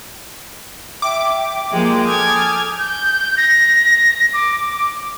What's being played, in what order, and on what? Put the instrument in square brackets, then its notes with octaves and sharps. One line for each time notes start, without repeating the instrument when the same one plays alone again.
[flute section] E5 G5 [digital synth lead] D6
[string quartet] F3 G#3 A#3 [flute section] G4
[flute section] A4 D#6 G6 [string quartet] G#5 F6 G#6
[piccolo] G6
A#6
D6